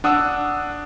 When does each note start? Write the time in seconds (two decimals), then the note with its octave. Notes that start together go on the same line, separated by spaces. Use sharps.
0.04 D4 F#5 D#6 E6